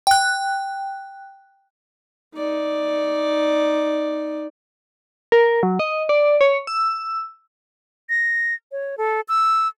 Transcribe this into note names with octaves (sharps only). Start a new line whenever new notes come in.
G5 F#6
D#4 D5
A#4
F#3
D#5
D5
C#5
E6
A#6
C#5
A4
E6